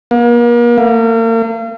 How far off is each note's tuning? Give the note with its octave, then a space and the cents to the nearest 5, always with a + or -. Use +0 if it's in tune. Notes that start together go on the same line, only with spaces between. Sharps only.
A#3 +40
A#3 -40